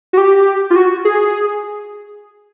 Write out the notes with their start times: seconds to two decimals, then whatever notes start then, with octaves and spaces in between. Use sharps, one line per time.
0.13 F#4
0.18 G4
0.70 F4
0.76 F#4
1.05 G#4